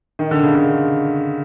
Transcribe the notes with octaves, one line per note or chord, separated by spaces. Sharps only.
D#3
D3
C#3
D3